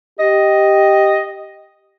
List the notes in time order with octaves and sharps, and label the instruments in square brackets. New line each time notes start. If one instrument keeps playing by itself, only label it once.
[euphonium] G4 [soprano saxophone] D#5